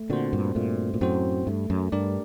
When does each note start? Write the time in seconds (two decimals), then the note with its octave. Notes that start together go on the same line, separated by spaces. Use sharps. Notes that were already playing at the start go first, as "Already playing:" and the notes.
Already playing: A3
0.10 A#2 D3 C4 F#4 C5
0.33 G2 A#2
0.55 G2 A#2 A3
0.94 A#2
1.01 F#2 A2 C4 F#4 C5
1.47 G2 A3
1.70 F#2
1.92 G2 D4 G4 A#4 D5